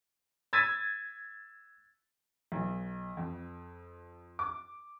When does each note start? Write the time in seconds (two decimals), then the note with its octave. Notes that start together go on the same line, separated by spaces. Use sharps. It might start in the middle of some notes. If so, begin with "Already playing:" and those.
0.53 E6 G#6 A6 B6 D#7
2.52 B1
3.17 F2
4.39 D6